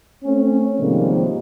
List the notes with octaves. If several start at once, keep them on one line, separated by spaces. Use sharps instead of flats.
A3 C4 C#4
G#2 C3 D#3 F3 G3 A#3